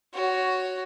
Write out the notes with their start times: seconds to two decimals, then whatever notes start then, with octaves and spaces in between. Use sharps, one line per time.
0.13 F#4 C#5